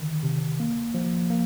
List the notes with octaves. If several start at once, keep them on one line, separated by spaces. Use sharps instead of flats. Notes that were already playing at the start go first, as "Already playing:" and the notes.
Already playing: D3 D#3
C3
A#3
F3
A#3